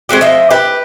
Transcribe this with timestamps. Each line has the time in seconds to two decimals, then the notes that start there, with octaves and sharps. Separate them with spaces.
0.09 G#3 C4 F#4 G4
0.21 F3 D#5 E5
0.51 G4 B4